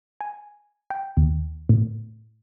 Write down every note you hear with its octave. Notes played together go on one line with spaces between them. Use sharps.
G#5
G5
D#2
A2